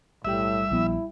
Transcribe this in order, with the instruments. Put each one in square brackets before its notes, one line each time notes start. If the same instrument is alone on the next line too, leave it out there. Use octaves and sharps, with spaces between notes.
[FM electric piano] B1 G3 G5 [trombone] A2 [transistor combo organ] E5
[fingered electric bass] A#1 F3 B3 [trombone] E4